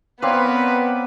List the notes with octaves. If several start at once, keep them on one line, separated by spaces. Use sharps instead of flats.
B3 C4 A#4 B4 C#5 D5 F5